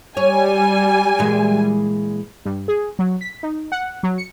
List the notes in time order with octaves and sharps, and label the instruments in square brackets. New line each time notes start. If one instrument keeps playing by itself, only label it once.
[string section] G3 G#5 [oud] C#5
[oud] A#2 E3 G#3
[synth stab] G2
G#4
F#3
B6
D#4
F#5
F#3
C#7